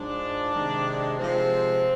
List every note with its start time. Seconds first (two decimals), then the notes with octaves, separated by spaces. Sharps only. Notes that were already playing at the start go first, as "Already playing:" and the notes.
Already playing: G#2 F3 G#3 D4
0.55 C3 D#3 G#3
1.20 C3 F3 G#3 C4